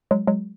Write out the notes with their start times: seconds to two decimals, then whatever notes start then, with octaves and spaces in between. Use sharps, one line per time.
0.11 F#3 G#3
0.27 F#3 G#3